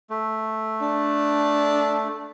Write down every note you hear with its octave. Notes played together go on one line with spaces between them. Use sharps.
A3
D4